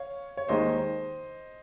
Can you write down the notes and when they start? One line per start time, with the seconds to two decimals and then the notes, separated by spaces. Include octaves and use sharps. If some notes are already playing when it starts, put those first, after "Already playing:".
Already playing: C#5 F5
0.37 C#5
0.48 D#2 D#3 G#3 D#4 C5 D#5